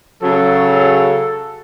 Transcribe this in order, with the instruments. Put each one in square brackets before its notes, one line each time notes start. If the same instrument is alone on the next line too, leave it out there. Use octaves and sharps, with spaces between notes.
[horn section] C#3 F#3 A4